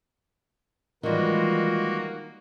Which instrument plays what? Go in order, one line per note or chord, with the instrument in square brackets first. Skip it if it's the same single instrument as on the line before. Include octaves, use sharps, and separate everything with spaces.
[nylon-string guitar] D#3 G3 [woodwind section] E3 G#3 F4 [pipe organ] A#3 F#4